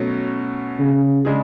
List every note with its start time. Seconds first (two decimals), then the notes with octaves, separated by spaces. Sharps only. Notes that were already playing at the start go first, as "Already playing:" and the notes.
Already playing: B2 F#3 A3 C#4
0.79 C#3
1.25 C#3 G#3 D4 G#4